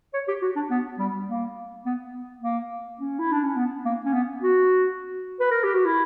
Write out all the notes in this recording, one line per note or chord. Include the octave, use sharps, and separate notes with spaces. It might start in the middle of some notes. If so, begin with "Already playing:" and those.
C#5
G4
F#4
D4
B3
G3
A#3
B3
A#3
C#4
E4
D4
C#4
B3
A#3
C#4
B3
F#4
B4
A#4
G4
F#4
E4